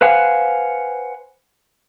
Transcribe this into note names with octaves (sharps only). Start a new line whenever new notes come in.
B4 C5 F5 F#5 G#5